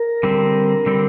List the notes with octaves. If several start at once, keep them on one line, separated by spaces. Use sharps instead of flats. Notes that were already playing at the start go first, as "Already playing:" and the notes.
Already playing: A#4
D3 G3 C4
D3 G3 C4